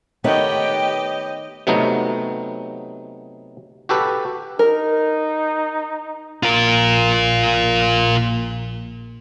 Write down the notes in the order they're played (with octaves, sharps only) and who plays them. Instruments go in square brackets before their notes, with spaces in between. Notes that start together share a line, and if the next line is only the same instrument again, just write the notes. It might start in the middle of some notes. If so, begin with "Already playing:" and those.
[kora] D#3 A3 [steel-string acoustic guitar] B3 B4 C#5 [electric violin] G4 D#5 [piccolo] G5
[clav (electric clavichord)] C3 F#3 A3 B3 D#4
F#4 G4 A4 B4
[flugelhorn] D#4 [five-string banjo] A#4
[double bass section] A#1 A#2 [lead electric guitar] F4 A#4